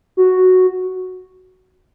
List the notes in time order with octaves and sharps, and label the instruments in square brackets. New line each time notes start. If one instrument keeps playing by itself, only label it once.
[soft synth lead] F#4